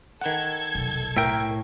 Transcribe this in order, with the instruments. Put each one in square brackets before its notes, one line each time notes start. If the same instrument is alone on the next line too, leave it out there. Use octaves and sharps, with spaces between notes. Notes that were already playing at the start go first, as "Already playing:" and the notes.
[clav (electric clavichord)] D#3 F#5 [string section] A4 G#6
[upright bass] F1 B1
[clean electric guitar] A2 G5 [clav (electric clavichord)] A#4 E5